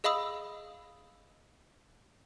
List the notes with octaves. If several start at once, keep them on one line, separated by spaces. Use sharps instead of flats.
G#4 D#5 F5 B5 D#6 E6